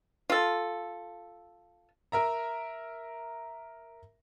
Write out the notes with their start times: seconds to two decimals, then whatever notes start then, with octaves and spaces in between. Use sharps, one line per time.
0.30 F4 A4
2.12 A#4 E5 A#5